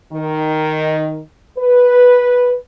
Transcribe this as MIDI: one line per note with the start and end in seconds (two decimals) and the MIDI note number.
0.13 1.19 51
1.58 2.55 71